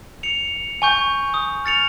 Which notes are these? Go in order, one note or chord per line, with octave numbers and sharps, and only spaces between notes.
C#7 F7
G#5 C#6 G6
D#6
F6 A6 C#7 F7